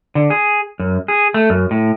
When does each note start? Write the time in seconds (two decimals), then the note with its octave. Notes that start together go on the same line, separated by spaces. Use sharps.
0.15 D3
0.30 G#4
0.80 F#2
1.08 G#4
1.34 A3
1.50 F#2
1.71 A2